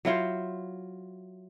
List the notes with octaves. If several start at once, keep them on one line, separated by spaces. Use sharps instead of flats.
F#3 E4 F4 C5